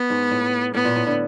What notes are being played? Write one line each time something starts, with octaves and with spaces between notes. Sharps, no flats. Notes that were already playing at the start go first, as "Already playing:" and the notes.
Already playing: B3
G#2
A2
A2 B3
A#2
A2
D3